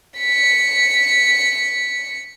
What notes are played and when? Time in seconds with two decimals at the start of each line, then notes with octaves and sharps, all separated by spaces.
0.18 B6 C#7